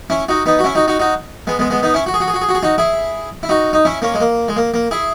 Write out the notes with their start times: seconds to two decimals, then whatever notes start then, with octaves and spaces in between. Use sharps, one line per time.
0.10 C#4 E4
0.29 D#4 F#4
0.46 B3 D#4
0.59 F#4
0.64 C#4 E4
0.75 D#4 F#4
0.88 D#4 F#4
0.99 D#4 F#4
1.47 G#3 B3
1.59 G#3 B3
1.70 G#3 B3
1.83 B3 D#4
1.94 C#4 E4
2.06 F#4
2.14 G#4
2.20 F#4
2.28 G#4
2.34 F#4
2.42 G#4
2.49 F#4
2.55 G#4
2.63 D#4 F#4
2.78 E4 G#4
3.43 E4
3.49 D#4 F#4
3.73 D#4
3.85 C#4 E4
4.02 A#3 C#4
4.14 G#3
4.20 A#3
4.48 G#3
4.56 A#3
4.74 A#3
4.91 E4 G#4